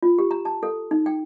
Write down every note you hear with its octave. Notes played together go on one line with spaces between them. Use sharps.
F4
G4
A#5
A5
A4
D#4
G5